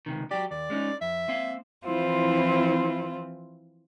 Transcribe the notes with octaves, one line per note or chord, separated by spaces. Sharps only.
C#2 C3 D#3
F#3 G4 D5
D#2 D5
G#3 C#4 D#4
F2 E5
A#3 C4 F5
E3 F3 C4 E4 F4 C5